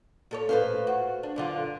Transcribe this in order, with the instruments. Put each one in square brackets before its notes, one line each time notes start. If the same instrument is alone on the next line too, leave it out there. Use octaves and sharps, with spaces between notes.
[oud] A#2 A4 C#5
[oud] A2 [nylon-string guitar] B4 C5 F5
[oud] F#4
D4
F#2 D3 F4